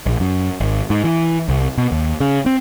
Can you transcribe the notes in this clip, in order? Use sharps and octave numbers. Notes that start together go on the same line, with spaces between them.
A#1
F#2
G#1
G#2
E3
C2
B2
D#2
C#3
C4